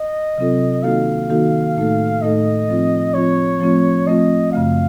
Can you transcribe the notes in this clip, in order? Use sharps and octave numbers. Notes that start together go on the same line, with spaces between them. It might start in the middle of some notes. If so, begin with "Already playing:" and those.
Already playing: D#5
C3 F#3 C4 F4 A4
D#3 A#3 D#4 F#4 A4 F5
D#3 A#3 D#4 F#4 A4
A2 A3 D#4 A4
A2 A3 D#4 A4 D#5
F3 C4 F4
F3 C4 F4 C#5
F3 A3 C4 F4
F3 A3 C4 F4 D#5
F#2 C#3 A3 F5